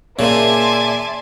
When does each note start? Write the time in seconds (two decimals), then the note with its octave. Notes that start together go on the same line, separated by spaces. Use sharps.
0.19 A#2 C#3 A#3 D5 E5 G#5 A5 C6